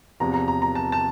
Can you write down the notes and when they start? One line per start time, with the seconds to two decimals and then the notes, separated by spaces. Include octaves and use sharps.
0.20 E2 C3 F3 A#5
0.34 A#5
0.48 A#5
0.62 A#5
0.75 A5
0.92 A5